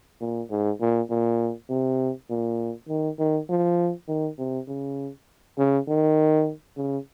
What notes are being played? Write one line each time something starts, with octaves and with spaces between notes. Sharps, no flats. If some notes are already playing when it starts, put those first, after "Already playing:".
A#2
G#2
A#2
A#2
C3
A#2
D#3
D#3
F3
D#3
C3
C#3
C#3
D#3
C#3